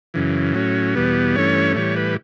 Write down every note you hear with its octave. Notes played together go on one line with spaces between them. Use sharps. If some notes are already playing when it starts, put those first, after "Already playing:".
F#2 C#3 E3
A2 F#3 C#4
E2 B2 G3 B3
G2 E3 A3 C#4 C#5
A2 E3 G3 C#5
B4